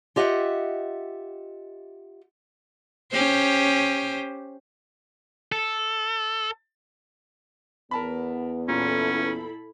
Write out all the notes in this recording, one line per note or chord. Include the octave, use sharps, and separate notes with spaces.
F4 G4 D#5 E5 F#5
C#4 G4 C5
A4
E2 B3 A#4 A5 B5
A#2 C#4 E4 A4 B5